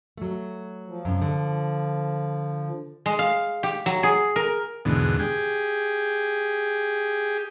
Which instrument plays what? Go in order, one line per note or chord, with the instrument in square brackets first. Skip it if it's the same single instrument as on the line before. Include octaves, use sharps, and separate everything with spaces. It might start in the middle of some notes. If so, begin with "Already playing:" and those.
[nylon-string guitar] F#3 A3
[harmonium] F3
[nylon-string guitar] F#2 C3
D3
[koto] G#3
F5
G4
F#3
G#4
A#4
[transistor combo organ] E2 G#2 B2 D3
G4 G#4